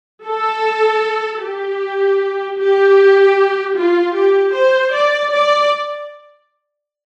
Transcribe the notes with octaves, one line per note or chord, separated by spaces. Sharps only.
A4
G4
G4
F4
G4
C5
D5
D5